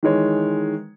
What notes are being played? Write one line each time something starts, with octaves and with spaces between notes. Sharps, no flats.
D#3 E3 G#3 C#5